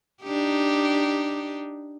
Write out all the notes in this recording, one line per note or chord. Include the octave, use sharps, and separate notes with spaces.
D4 D#4 G4